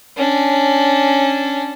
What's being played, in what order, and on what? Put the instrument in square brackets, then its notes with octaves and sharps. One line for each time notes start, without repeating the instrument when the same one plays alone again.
[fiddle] C#4 D4